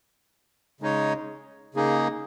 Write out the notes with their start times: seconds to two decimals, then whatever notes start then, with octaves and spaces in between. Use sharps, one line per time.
0.80 C#3 G#3 D#4 C#5
1.75 C#3 A#3 D#4 G#4